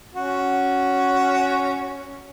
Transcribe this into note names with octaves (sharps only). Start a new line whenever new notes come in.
C#4 F#4